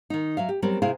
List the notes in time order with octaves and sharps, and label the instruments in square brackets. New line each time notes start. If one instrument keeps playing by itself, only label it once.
[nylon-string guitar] D#3 D#4
F#3 E5 F5
G4
F#3 G3 B3 C4 A#4
C3 E4 G#4 C5 F5 G5